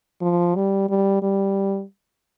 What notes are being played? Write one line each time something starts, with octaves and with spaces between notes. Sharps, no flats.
F3
G3
G3
G3